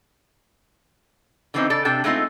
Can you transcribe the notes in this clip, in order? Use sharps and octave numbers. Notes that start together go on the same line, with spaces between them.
D3 E3 F3 C4 C#4 D#4
C#3 A4 D5
C3 D4 A4 G5
G#3 A3 B3 C4 D#4 F4